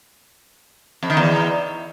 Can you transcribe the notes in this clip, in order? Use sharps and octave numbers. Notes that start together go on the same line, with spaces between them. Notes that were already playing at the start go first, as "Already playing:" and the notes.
F2
D#3
E2